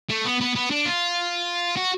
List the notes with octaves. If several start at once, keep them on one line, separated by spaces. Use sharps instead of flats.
A3
B3
B3
B3
D4
F4
F#4